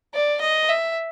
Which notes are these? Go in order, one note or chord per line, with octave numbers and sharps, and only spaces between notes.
D5
D#5
E5